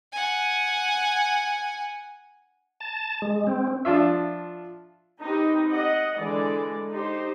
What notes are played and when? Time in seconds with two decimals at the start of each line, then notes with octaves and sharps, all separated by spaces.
0.12 F#5 G#5
2.80 A5
3.22 G#3
3.47 C4
3.85 F3 D4 F4 E5
5.23 C4 D#4 G4 B4
5.70 D#5 F#5
6.17 D3 E3 G#3 D5
6.90 D#4 G4 C5